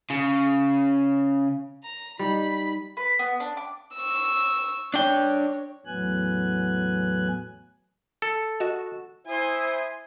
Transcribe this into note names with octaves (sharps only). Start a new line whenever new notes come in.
C#3
A#5
G3 D#4 B5
B4
B3
D4
D6
C#6 E6
D4 C#5 G5
E2 A2 F#3 B3 G#5 F#6
A4 C#7
F#4 D#5 E7
E4 C5 G#5 C6 D#6